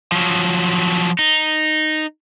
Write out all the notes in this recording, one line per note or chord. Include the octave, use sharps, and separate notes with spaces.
F3 F#3
D#4